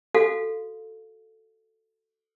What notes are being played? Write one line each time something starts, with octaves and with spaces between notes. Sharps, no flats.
F#4 A4 F5